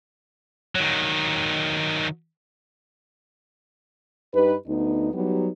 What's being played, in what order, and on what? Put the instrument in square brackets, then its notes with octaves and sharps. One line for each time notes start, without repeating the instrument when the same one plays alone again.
[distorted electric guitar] D#3 F#3
[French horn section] G2 D#4 G4 B4
D2 B3 D#4
F#3 G3 B3 D#4 G4